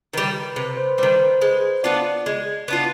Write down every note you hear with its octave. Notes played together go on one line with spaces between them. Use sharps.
D#3 G3 B4
C3 B4
C5
D#3 G3 C5
C5
B4
G#3 C5
B3 D4 F4 D5
G#3
B3 D4 F4